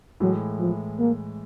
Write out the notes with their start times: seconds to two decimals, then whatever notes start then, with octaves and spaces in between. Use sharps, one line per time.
0.20 A2 E3 F#3 G#3
0.60 F3
0.99 A#3